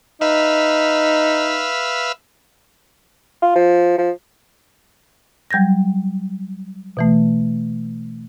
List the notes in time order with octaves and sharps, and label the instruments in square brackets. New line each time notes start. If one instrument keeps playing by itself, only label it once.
[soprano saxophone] D#4 [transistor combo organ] B4 E5 F5
[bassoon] F4
F3
F3
[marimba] F#3 G3 G6 G#6 A#6
B2 E3 A3